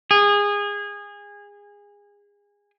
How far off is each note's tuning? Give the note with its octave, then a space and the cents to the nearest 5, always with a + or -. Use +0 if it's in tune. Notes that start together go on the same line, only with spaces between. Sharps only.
G#4 -25